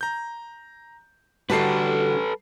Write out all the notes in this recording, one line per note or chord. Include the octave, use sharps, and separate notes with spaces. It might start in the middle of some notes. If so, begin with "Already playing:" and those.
A#5 G6
D3 G3 D4 F#4 A4 B4 A5 C7